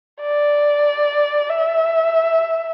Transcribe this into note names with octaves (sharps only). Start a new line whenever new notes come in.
D5
E5